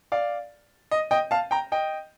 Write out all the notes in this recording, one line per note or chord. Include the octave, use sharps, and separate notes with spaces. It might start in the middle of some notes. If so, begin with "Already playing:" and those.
D5 F5
D#5
D#5 G5
F5 A5
G5 A#5
D#5 G5